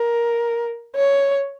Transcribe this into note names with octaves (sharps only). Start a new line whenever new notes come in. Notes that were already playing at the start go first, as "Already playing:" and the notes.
Already playing: A#4
C#5